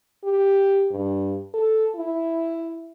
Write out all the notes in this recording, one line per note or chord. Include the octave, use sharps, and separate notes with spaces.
G4
G2
A4
E4